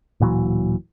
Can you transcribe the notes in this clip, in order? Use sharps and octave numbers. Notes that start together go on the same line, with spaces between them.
D1 A#2 E3 F#3